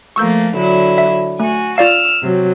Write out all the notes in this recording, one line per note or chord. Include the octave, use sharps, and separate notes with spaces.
F3 A3 A#3 C#6 E6 G6
D3 F#3 E4
E5
A3 F#4 G#5
F4 D5 F5 E6 F6
C3 F#3